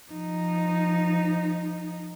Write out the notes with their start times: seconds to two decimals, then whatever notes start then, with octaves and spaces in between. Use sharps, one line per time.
0.12 F3 D#4